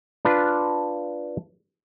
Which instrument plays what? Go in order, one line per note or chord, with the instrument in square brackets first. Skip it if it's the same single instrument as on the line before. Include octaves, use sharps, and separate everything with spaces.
[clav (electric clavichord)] D4 F4 B4